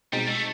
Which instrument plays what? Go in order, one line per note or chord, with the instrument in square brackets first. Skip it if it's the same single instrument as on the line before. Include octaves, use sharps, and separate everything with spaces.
[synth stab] B2 G#3 C4 D#4 [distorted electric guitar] G3
[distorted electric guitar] A3